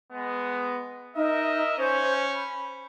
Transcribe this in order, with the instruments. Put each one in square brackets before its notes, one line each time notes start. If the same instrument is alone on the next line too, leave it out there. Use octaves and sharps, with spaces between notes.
[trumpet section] G#3 B3
[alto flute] D#4 [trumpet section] A#4 D#5 E5
[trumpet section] C#4 [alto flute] C5
[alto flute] B5